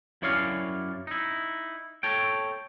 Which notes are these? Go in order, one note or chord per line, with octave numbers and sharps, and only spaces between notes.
F#2 E4 C#5 D5 F5
D#4 E4
A4 C#5 G5